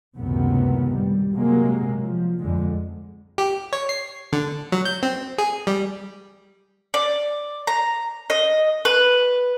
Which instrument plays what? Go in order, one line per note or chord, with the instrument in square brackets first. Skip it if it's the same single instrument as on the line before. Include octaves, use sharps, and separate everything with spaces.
[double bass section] C#2 F#2 A2 C3 D#3 B3
G3
C3 F#3 G#3 A#3
F3
F2 D3 G#3
[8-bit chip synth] G4
C#5
C7
D3
F#3
G6
C4
G#4
G3
[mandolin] D5
A#5
D#5
B4